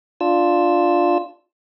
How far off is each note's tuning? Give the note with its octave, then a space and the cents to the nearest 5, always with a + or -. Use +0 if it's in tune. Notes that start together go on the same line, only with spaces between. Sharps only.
D4 +0 F4 +0 E6 +0